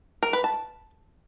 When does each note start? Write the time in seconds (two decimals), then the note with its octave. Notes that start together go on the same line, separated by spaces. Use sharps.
0.23 A#4
0.33 B4
0.44 A5